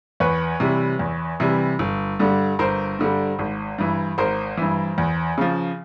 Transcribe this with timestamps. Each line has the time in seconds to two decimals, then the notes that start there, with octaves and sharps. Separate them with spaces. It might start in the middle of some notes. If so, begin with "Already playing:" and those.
0.20 E2 B4 C#5
0.60 C3 E3 G3
0.99 E2
1.40 C3 E3 G3
1.79 G1
2.19 G2 D3 G3
2.59 G1 A#4 C5
2.99 G2 D3 G3
3.39 G#1
3.78 G2 E3
4.18 G#1 A#4 C5
4.57 G2 E3
4.98 E2
5.38 C#3 F3